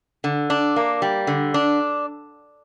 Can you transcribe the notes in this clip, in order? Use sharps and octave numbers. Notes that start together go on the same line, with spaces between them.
D3
D4
A#3
G3
D3
D4